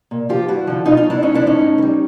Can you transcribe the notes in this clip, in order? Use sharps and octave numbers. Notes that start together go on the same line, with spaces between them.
A#2
F3 F4 G4
G2 E4 F#4
D3 F3
B2 D#4 F4
D#4 F4
F#3
D4 E4
G#2 C#4 D#4
D4 E4
F3
C#4 D#4
A2
E3
G3